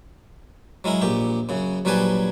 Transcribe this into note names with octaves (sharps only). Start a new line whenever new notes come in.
F#3 G#3 E4 A#4
A#1 A#2 G4
F#2 C#3
A#1 F#3 G3 B4 G#5 A5